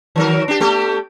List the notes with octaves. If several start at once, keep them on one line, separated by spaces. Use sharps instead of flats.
D#3 F#3 A#4
D4 G4
A3 B3 G4